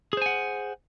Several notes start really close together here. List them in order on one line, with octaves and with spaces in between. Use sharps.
G#4 C5 G#5 F#5